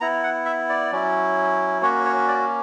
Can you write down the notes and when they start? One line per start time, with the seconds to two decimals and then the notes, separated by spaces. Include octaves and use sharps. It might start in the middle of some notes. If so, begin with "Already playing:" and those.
0.01 B3 E4 A#5
0.23 F#5
0.45 E5
0.69 D5
0.92 F#3 C#4 E4
1.82 A#3 C#4 F#4 C#5
2.05 C#5
2.28 D5